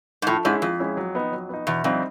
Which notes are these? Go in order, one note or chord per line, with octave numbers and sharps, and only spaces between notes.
G#2
A2 F3
G#2 G#3 C#4 E4
F2 F3
G#3 C#4 E4
F#3
B3 D#4
F#3
B3 D#4
E2 B2
F2 G3 C4 D#4